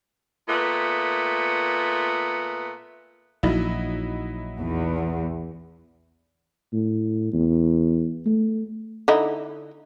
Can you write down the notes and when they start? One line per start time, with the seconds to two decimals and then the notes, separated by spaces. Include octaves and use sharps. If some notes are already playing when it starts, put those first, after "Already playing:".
0.48 A#2 A3 B3
3.43 A#1 F#3 D#4 E4
4.60 E2
6.73 A2
7.33 E2
8.26 A3
9.08 D3 D#4 E4